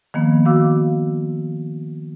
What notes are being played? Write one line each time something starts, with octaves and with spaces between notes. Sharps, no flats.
D#3 F3 A#3 B3
D#3 F#4 F5 D6 E6